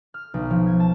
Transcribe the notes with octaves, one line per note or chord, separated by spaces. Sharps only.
F6
B1
F3
G#6
A5